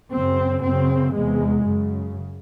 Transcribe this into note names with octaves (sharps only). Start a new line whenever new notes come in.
F#2 C#3 C4
F#2 C#3 C4
E2 C3 G#3
F#2 C#3